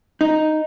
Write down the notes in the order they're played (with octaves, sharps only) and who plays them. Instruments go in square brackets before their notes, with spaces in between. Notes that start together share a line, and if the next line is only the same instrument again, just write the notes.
[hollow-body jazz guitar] D#4